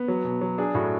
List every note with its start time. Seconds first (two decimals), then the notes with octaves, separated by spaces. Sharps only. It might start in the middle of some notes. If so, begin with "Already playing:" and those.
Already playing: B3
0.08 F#3
0.24 B2
0.41 F#3
0.58 D4 G#4
0.75 A2 F#4